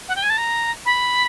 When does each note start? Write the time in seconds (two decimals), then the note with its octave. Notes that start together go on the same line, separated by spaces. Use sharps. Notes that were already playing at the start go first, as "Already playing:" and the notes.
0.08 F#5
0.15 G5
0.23 G#5
0.30 A5
0.37 A#5
0.85 B5